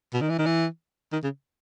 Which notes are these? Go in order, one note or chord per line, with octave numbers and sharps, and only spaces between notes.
B2
D#3
E3
D#3
E3
D#3
C#3